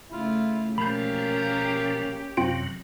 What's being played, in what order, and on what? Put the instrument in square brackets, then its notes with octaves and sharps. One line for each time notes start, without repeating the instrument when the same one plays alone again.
[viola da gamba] C#3 A3 [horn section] E4 F4
[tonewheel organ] B2 F3 [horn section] A#3 [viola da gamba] C#4 G4 [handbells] B5 G6
[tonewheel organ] F#2 C3 F#3 [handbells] C4 F4 D7